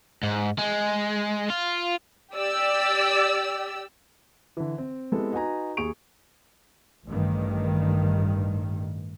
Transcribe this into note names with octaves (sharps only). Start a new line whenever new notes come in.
G#2
G#3
F4
G4 D5 E6
D3 E3
C4
G#3 B3 C4 E4 G4 A4
D#4 F#4 B4 G#5 A#5
D#2 G#4 C#6 D7 F7
A1 G2 D#3